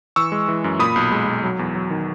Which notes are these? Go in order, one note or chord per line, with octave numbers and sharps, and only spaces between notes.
E3 C#6 E6
G#3
E3
F#2
A#2 B5 D#6
B1
G#3
B1
F#3
E2
F#3
D#3